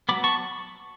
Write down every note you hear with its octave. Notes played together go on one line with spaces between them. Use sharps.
F#3 B3 B5 D6
A5 C#6